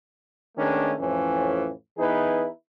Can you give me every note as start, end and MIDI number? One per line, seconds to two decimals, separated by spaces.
0.58 0.93 51
0.58 0.93 56
0.58 0.93 57
0.58 0.93 59
0.58 0.93 61
0.58 0.93 62
0.98 1.70 41
0.98 1.70 45
0.98 1.70 52
0.98 1.70 53
0.98 1.70 61
1.98 2.47 52
1.98 2.47 59
1.98 2.47 63
1.98 2.47 64
1.98 2.47 68
1.98 2.47 71